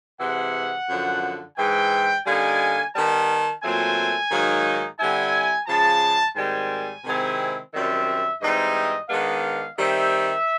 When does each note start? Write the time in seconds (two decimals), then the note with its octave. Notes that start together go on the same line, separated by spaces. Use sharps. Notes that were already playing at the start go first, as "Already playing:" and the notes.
0.20 C3 E3 G#3 F#5
0.88 F#2 D3 F3
1.57 G#2 E3 G#3 G5
2.26 D3 G3 A#3 D#4 G#5
2.93 D#3 G3 B3 A5
3.62 A#2 F#3 A3 C4 G#5
4.31 G#2 D#3 F#3 A#3 D#4
4.98 D3 G3 C4 E4 G#5
5.67 C#3 F3 G#3 A5
6.36 G#2 D#3 G3 C4 G#5
7.05 C3 D#3 G#3 C4 E4
7.73 F#2 D#3 G3 C4 E5
8.41 G#2 E3 G3 C4 D#4 D#5
9.09 D#3 G#3 B3 D4 F5
9.78 D#3 G3 C4 E5